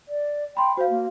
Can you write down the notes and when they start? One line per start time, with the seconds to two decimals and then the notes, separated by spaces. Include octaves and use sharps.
0.08 D5
0.57 G5 B5 C6
0.77 F#4 C5 F5
0.90 A#3